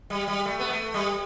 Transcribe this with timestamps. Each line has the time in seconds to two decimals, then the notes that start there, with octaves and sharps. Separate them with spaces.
0.10 G3
0.28 G3
0.45 A3
0.60 B3
0.71 A3
0.94 G3